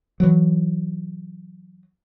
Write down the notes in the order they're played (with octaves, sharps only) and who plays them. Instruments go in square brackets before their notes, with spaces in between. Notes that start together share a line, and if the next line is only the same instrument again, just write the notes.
[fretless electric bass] E3 F#3